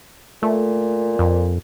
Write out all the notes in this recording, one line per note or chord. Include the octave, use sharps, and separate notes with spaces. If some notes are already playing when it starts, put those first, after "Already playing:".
A#2 A3
F2